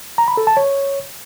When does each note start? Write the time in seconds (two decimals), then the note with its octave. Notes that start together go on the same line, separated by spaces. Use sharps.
0.18 A#5
0.28 B5
0.37 A4
0.47 A5
0.57 C#5